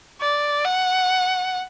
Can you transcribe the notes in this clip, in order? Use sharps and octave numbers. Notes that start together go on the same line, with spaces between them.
D5
F#5